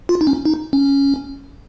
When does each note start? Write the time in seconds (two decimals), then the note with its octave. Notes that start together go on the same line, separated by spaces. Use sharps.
0.09 F4
0.21 D#4
0.27 C#4
0.45 D#4
0.73 C#4